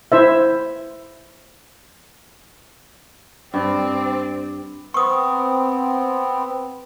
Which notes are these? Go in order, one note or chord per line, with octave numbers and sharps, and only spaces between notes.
E4 C5 E5
G2 C4 D5
B3 C4 C#6 D#6